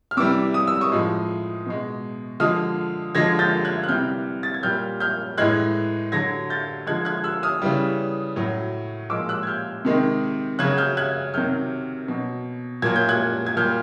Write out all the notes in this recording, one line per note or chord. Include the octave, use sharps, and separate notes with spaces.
F6
C3 E3 G3 D6 E6
D#6
E6
C#6 D#6
A2 F3 G#3
B2 G#3
D3 F3 G#3 D#6 F6
D3 F3 G#3 G#6 A#6
G6 A6
F#6 G#6
F#6
C3 E3 G3 F6 G6
A6
G#6
A#2 G3 F6 G6
F6 G6
A2 E3 G#3 F#6 G#6
D3 F#3 G#6 A#6
G6 A6
D3 F3 G#3 F#6 G#6
F#6 G#6
E6 F#6
D#6 F6
C#3 E3 G3
A2 F#3
A#2 F3 G#3 D6 E6
E6 F#6
G#6
F6 G6
C3 D#3 G#3
C#3 F#3 F#6 G#6
F6 G6
F#6 G#6
C3 D#3 F#3 F6 G6
B2 F#3
A#2 F#3 G#6
G6
F#6 G#6
G#6
A#2 G3 F6 G6